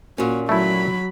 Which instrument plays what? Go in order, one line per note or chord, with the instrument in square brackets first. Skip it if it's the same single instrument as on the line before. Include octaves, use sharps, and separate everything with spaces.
[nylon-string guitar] A#2 C#4 [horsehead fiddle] F#4
[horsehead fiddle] F#3 B5 [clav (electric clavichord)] A3 E4